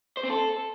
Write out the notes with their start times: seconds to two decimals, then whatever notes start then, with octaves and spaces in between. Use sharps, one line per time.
0.17 C5
0.23 C4
0.30 A4